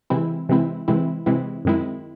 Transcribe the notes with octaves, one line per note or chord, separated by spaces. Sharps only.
C3 E3 G#3 C4 E4
C3 E3 G#3 C4 E4
C3 E3 G#3 C4 E4
C3 E3 G#3 C4 E4
F#2 D#3 G#3 C4 E4